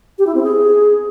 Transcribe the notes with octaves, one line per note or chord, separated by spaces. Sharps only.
G4
E4
C4
G#4